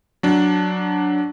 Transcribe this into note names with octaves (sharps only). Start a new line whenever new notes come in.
F#3 D4